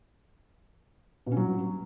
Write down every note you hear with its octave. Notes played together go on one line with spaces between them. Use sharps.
B2
C#4
F#3